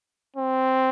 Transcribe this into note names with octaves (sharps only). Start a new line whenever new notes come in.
C4